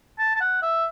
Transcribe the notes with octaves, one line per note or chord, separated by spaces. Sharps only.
A5
A5
F#5
E5